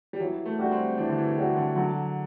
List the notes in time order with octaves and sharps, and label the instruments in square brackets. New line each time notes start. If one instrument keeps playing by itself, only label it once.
[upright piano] G3
[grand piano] E3 [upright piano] F#3
[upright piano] A3
[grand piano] G3 D4 F#4
[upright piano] C4
[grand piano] E3 [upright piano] D4
[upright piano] D3
E3
[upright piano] F#3 [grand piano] G3 D4 F#4
[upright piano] D3
[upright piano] D3 [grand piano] F#3